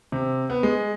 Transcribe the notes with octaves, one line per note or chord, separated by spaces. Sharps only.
C3
B3
G#3